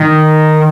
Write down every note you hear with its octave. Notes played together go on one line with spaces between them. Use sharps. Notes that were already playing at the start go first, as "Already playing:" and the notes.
Already playing: D#3